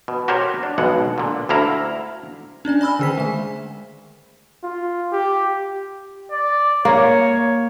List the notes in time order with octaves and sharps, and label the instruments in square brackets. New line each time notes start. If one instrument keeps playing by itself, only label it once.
[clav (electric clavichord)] B2
F#4 G4 A#4 C5 C#5
D4
B1 B2 G#3 F#5
A#2 D3
D2 D3 E4 F5 A#5
[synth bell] C#4 D4 D5 G#5
D5 G#5 B5 E6 F6
D3 D#3 G#4 C5 B6
G#3 A3 G#5
[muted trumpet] F4
G4
[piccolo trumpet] D5
[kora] A#3 [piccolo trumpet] C#5